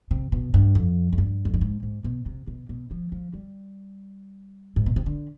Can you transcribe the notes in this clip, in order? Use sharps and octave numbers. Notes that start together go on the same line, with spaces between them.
C3
B2
G2
F2
F2
G2
F2
G2
G#2
G#2
B2
C3
B2
B2
F3
F3
G3
G#2
B2
C3
D3